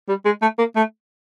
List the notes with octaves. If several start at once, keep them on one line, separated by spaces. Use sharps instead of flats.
G3
G#3
A3
A#3
A3